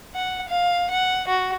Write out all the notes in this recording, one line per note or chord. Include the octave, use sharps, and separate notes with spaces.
F#5
F5
F#5
F#4